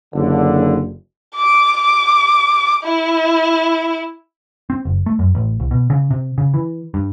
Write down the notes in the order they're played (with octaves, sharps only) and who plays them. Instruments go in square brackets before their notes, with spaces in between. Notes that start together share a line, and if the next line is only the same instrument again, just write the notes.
[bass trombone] F#1 [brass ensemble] D3
[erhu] D6
D6
E4
[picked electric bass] C4
F#1
A3
F#2
A1
C2
B2
C#3
C3
C#3
E3
G2